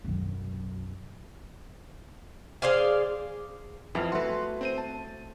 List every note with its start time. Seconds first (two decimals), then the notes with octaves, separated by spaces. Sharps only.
0.04 B1 F#2
2.62 G#4 C5 D5 F5
3.95 F2 E3 B3 F5
4.12 A3 F#4 B4 C6
4.61 C4 C5 D#7
4.78 A5